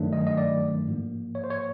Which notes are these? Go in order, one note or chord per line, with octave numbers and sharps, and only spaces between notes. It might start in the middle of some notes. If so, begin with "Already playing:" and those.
Already playing: G2 D#3 F#3 A3 D4
D#5
D#5
D5
G#2 F3 A#3
C#5
C5
C#5